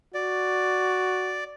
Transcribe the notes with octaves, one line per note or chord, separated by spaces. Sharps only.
F#4 D5